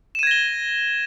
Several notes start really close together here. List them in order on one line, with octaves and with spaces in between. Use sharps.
E7 D#7 G#6 A#6 G7